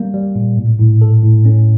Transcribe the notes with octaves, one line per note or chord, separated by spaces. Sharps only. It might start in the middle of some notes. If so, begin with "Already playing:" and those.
Already playing: G3 A#3
G3
A#2
A2
A2
A4
A2
C#4